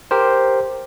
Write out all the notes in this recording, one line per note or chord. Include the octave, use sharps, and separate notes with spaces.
G4 A#4 C5